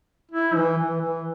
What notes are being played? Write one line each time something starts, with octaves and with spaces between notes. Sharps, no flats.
E4
E3
E3
E3